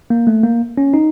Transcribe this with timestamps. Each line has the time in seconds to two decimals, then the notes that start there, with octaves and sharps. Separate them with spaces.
0.10 A#3
0.27 A3
0.43 A#3
0.78 C#4
0.94 D#4